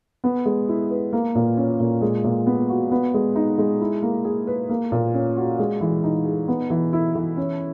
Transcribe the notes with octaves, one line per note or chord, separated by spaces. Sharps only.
B3
G#3
E4
B4
A#3
A#2
C#4
A#2
G#3
A#2
B3
F#4
B3
G#3
D#4
G#3
E4
A#3
G#4
B4
A#3
A#2
C#4
F#4
G#3
E3
D#4
G#4
B3
E3
E4
E3
C#4